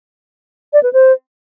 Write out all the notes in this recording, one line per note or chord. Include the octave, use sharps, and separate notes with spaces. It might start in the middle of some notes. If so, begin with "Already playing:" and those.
D5
B4
C5